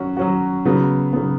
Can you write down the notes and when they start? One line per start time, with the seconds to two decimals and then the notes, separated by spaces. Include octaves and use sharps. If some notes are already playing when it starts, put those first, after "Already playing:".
Already playing: F#3 C#4 F#4
0.17 F#3 C#4 F#4
0.65 C#3 F#3 B3
1.13 C#3 F#3 B3